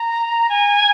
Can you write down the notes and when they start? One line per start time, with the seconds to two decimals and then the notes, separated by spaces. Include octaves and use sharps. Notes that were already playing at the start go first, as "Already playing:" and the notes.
Already playing: A#5
0.49 G#5